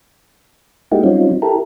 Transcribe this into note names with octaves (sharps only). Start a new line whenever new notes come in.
G#3 A#3 D#4 E4 F#4 G4
F#3 G3 C4 C#4 D#4 F4
E4 G4 A4 A#4